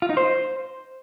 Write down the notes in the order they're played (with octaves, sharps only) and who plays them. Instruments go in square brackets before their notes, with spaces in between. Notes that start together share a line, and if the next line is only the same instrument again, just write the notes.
[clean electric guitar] F4
D#4
C5